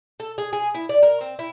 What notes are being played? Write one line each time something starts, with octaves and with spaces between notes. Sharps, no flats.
A4
G#4
G#4
E4
D5
A#4
C4
E4